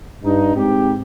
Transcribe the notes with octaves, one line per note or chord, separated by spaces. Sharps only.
G2 D#4
G#2 C4 G4